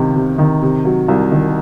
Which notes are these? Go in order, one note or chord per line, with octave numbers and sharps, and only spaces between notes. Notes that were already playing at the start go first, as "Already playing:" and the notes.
Already playing: C#2 C3 D#3
C3
D#3
C3
F#3
C2
D#3